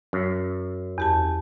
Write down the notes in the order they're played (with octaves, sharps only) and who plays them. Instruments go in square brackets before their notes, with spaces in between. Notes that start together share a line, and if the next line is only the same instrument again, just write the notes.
[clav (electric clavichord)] F#2
[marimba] E2 G4 A5